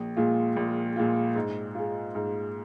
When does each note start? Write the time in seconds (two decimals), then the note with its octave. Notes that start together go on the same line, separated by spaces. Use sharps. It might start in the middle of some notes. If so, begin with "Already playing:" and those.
Already playing: A#1
0.17 A#2 G#3 F4
0.56 A#1
0.96 A#2 G#3 F4
1.36 G#2
1.75 G#3 F4
2.15 G#2